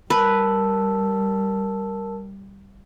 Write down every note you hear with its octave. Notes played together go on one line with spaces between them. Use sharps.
G3 A#4 B4 A5 E6